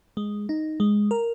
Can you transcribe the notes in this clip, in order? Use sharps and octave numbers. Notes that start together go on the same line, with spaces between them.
G#3
D#4
G#3
A#4